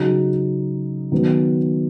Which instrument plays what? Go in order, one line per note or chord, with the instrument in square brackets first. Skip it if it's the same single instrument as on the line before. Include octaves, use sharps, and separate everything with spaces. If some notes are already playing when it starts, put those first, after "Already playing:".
Already playing: [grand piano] C#3 F#3 D#4 F#4
D#3 F#3 B3